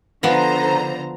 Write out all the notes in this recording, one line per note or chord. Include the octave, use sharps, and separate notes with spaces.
D3 F3 B3 C5 A#5